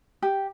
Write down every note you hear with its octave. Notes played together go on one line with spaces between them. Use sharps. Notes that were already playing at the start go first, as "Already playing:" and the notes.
G4